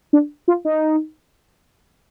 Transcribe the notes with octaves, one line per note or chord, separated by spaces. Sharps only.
D4
F4
D#4